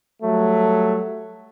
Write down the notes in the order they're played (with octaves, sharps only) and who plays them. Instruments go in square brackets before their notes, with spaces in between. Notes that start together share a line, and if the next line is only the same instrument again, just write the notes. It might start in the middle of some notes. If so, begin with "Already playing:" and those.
[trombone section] F#3 G3 A3